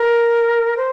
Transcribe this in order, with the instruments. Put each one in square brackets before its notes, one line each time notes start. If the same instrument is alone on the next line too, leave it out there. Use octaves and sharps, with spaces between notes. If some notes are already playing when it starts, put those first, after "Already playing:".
Already playing: [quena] A#4
C5